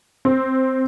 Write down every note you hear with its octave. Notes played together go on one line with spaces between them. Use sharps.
C4